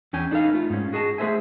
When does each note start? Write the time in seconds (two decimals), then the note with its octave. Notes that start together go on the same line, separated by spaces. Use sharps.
0.13 E2 C#4 G5 G#5
0.31 D4 D#4 A4 B4 F5
0.53 A3 F4
0.70 G#2 C#4
0.93 F#4 G#4 D#5 G#5 A5
1.18 A3 G#4 A#4 C5 E5 G#5